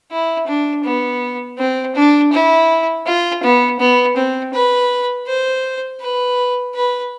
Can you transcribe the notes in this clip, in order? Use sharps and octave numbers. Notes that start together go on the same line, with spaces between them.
E4
D4
B3
C4
D4
E4
F4
B3
B3
C4
B4
C5
B4
B4